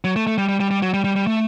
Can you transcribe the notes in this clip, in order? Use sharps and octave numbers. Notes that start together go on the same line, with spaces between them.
F#3
A3
A3
G3
G3
G3
G3
F#3
G3
G3
G3
A3